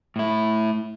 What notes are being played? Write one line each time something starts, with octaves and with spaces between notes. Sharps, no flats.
A2 E4